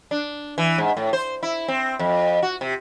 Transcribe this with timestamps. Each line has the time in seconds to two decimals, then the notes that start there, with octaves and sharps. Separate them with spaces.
0.11 D4
0.58 E3
0.78 G#2
0.97 A2
1.13 C5
1.43 E4
1.68 C4
1.99 F2
2.43 F#4
2.61 C3